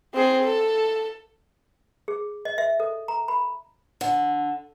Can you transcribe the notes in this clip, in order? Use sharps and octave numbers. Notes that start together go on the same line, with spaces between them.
C4 G#4
A4
G#4
D#5
E5
A4
A#5
B5
D3